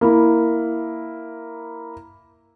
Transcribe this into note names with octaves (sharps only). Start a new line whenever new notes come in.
A#3 E4